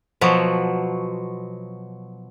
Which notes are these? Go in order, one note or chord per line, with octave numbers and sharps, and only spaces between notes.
B2 F3 F#3